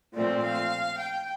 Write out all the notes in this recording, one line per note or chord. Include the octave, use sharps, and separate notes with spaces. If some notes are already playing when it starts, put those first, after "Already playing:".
A#2 F3 A3 C4 D5
F5
G5